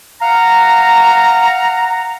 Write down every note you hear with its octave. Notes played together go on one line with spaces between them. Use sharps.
F5 F#5 A#5